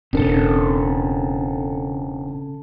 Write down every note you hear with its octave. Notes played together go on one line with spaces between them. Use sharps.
E1 C#3 C4 D4 A4 A#4